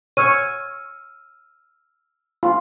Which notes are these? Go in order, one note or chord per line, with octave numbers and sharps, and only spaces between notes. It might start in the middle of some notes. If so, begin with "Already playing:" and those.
C#5 E6 F6 D#7
F4